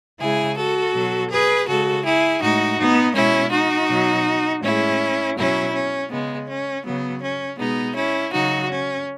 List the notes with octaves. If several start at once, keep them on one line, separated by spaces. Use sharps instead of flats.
C#3 G#3 E4 G#4
F#4 A4
B2 F#3
G#4 B4
C#3 G#3 F#4 A4
E4 G#4
A2 G#3 D#4 F#4
B3 D#4
B2 G#3 C#4 E4
D#4 F#4
B2 F#3
A2 G#3 C#4 E4
B2 F#3 C#4 E4
C#4
C#3 G#3 B3
C#4
C#3 F#3 B3
C#4
B2 G#3 B3 D#4
C#4 E4
C#3 F#3 D#4 F#4
C#4